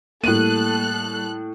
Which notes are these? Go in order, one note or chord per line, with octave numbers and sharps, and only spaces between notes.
A2 G3 A#3 A4 F#6 D#7